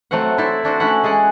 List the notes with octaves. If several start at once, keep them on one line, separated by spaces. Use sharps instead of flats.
F#3 A3 C4 C5 F#5
E4 A4 C5 D5
C4 D4 F#4 C5
A3 C#4 E4 F#5
G#3 G#4 D5 F#5